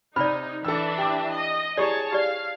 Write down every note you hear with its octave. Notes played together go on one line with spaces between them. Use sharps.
C3 D#4 D5 B5 F6
E3 D4 A4 E5 E6
G4 D6
D#5
E4 G4 G#4 C#5 D5 A5
G4 D5 F5